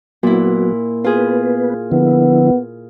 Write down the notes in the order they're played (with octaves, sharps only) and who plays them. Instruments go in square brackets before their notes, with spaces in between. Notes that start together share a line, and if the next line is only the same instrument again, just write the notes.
[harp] A#2 E4 [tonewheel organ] F#3 B3 F#4
[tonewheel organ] B3 B4 [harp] F4 G#4
[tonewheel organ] D3 F3 E4 [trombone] B3